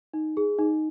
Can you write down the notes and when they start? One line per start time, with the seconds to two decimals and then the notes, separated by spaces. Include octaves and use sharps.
0.14 D#4
0.37 G#4
0.59 D#4